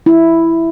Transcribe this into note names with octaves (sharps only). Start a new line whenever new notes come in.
E4